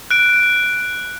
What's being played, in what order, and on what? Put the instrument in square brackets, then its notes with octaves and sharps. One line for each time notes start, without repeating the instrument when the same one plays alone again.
[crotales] F#6 D7